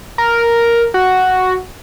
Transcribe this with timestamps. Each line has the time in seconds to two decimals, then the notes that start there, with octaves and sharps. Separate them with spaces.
0.18 A#4
0.94 F#4